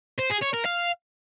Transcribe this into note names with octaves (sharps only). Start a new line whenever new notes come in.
C5
G#4
C#5
A#4
F5